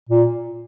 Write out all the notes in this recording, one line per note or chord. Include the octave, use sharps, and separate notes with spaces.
A#2